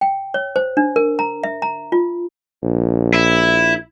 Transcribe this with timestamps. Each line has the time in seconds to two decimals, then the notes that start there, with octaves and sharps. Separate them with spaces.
0.01 G5
0.34 C#5
0.56 C5
0.77 D4
0.96 A#4
1.19 A#5
1.44 E5
1.62 A#5
1.92 F4
2.63 A#1
3.14 E4